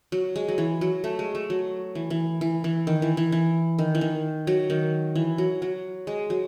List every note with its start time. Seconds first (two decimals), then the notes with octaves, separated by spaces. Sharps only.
0.12 F#3
0.36 G#3
0.48 F#3
0.58 E3
0.81 F#3
1.04 A3
1.19 G#3
1.35 A3
1.50 F#3
1.95 E3
2.10 E3
2.41 E3
2.64 E3
2.87 D#3
3.02 E3
3.17 E3
3.32 E3
3.79 D#3
3.95 E3
4.01 D#3
4.47 F#3
4.70 D#3
5.16 E3
5.38 F#3
5.62 F#3
6.07 G#3
6.30 F#3